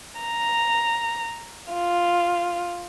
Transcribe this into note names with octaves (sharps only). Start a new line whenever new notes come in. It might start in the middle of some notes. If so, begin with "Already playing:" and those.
A#5
F4